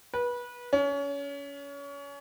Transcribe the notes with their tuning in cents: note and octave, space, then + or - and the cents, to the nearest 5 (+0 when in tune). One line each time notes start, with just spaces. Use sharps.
B4 -25
C#4 +30